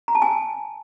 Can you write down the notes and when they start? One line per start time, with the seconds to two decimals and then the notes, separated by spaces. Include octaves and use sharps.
0.08 A#5
0.15 A5
0.22 G#5